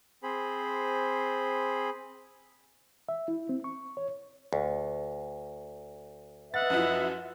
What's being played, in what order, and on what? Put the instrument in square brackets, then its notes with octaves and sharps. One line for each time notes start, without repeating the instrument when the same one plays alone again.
[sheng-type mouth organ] C4 G#4 C5 B5
[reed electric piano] E5
E4
C4
C#6
C#5
[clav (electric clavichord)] D2
[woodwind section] B4 D#5 E5 [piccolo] F#5 [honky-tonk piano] A6
[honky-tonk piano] F#2 F3 E4